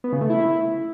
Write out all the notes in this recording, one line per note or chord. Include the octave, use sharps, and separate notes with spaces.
B3
C#3
A3
E4